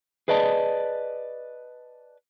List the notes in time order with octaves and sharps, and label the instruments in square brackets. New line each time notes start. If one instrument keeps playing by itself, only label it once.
[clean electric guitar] G#4 B4 D5 D#5 A5